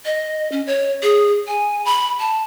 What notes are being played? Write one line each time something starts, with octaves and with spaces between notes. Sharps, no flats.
D#5
C#4
C#5
G#4
G#5
B5
A5